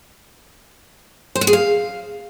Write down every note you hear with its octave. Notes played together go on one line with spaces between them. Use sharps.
C5
F#4
G#4
F5